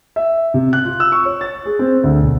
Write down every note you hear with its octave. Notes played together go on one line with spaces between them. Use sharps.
E5
C3
F#6
F4
E6
C#6
C#5
A6
G#4
C4
D2
B1